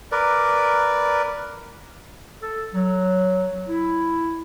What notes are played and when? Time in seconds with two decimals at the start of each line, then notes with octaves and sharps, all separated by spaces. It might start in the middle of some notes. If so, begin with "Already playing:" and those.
0.12 A#4 B4 D5
2.42 A4
2.73 F#3
3.68 E4